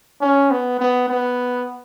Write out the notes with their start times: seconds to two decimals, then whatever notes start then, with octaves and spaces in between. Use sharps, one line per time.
0.21 C#4
0.50 B3
0.79 B3
1.08 B3